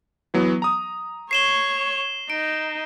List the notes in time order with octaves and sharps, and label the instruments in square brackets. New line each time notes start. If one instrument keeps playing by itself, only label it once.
[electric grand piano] E3 F#3 B3
A#5 D#6
[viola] C#5 C#6 [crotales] C7 E7 G7
[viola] D#4 [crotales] D7